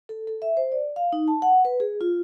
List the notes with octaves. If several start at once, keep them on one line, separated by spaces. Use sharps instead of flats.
A4
A4
E5
C5
D5
F5
D#4
A5
F#5
B4
G#4
F4